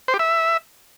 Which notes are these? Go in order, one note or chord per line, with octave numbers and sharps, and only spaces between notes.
C5
G4
E5